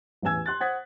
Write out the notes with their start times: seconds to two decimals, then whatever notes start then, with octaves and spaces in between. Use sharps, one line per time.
0.22 A1 E2 B4 G#5 E6 G#6
0.46 C6 F#6 A6
0.60 C5 F#5 D#6 G#6 A6 B6